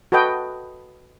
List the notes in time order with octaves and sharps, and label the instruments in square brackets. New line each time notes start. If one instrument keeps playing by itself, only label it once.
[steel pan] F#4 A4 B4 D#5 G5